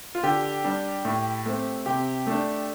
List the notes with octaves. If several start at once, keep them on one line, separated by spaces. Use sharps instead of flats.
F4
D3 G4
G3 D4
A2
A3 C4
C3 G4
A3 D4